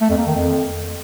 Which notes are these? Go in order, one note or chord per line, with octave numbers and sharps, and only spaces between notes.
A3
F2
A#3
D#3
F2